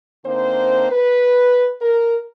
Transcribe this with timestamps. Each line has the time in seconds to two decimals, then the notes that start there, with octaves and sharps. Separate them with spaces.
0.25 D3 A#3 C4 D#4 C5
0.90 B4
1.81 A#4